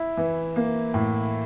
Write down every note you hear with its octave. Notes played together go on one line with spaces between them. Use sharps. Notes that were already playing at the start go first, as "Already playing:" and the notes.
Already playing: E4
E3
A#3
A2